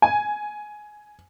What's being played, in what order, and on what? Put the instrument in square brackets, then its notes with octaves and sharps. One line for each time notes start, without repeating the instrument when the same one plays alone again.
[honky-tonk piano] G#5